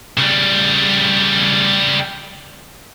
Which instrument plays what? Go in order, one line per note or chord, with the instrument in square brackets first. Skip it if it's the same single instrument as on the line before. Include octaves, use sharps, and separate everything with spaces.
[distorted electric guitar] C#3 G3